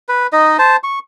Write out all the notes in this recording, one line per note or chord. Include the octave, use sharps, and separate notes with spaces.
B4
D#4 D#5
C5 A5
C#6